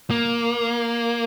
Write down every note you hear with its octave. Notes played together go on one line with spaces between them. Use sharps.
A#3